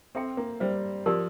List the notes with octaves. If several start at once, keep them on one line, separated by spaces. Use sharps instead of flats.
C4 A4 E5 G5
A#3
G3 C5 E5 G5
F3 G4 A#4 D5